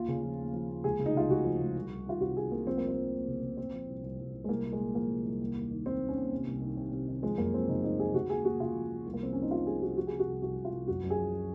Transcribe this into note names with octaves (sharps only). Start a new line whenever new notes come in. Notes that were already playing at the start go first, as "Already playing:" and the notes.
Already playing: D#2 F4
C#3
F3
D#2
F3
D#2
C#2 G#4
C#3
D#4
C#2 F4
C#3 F#4
F3
C#2
C2
C2
D#3 F4
C3 F#4
D#3 G#4
C2 A#3
F3 C4
D#2 A#3
C4
F3
D#2
C#3
C#3
A#2 C4
F3
C2
C2
C2
C2
G#3
C2 A#3
A#2
G#3
A#2
F3 A#3
C2
C2
D#2
D#2
D#3
D#3 C4
D#2
C#4
D#2
C3
C2
D#3
C3
C3
D#3
F3 G#3
F#2 A#3
F3 C4
C#3 D#4
F3 D#4
F3 G#4
C#3 F#4
D#2 G#4
D#2 F#4
C#3 F4
F3
F3
C2
A#3
F3 C4
F3 C#4
D#4
F3 F4
F3 G#4
C2 F#4
F3 F#4
C3 G#4
F#4
C2
C2 F#4
C2
F4
C2
F#2 F#4
F#2
G#4
F3
F3